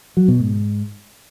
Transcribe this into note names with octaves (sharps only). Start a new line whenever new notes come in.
F#3
B2
G#2